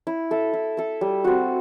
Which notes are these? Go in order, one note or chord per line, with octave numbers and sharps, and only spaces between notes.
E4
A4 E5
E4
A4 E5
G3
C4 F#4